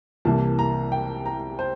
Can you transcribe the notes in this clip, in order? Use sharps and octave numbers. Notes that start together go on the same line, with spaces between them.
C2 C3 E3 A#3 A5
A#5
G5
A#5
C5